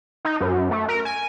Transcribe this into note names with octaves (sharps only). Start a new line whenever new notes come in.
D#4
F#2
A3
A#4
G#5